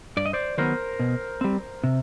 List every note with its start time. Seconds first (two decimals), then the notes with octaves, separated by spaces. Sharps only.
0.17 G2 D5
0.26 D#5
0.33 C5 D5
0.58 D#3 F#3 B3 A#4 C5
0.99 B2
1.41 G3 C4
1.84 C3